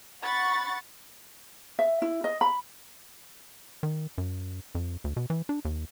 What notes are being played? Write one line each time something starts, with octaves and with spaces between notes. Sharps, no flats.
F#5 B5 C#6 A6
E5
E4
D#5
B5
D#3
F#2
F2
D2
B2
E3
D4
D#2